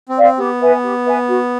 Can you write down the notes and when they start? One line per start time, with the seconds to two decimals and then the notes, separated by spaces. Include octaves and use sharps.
0.09 C4
0.17 D5 F5
0.23 C4
0.38 B3 G4
0.61 B4 E5 G#5
0.83 G4
1.05 B4 E5 G#5
1.28 F#4